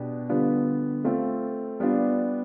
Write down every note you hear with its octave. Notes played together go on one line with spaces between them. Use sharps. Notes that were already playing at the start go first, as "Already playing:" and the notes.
Already playing: B2 B3 D4 G4
D3 G3 B3 F4 B4
A3 C4 F4 A4
G3 B3 D4 F4